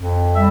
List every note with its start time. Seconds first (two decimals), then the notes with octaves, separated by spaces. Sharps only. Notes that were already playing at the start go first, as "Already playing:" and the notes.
Already playing: F2
0.33 G3 E5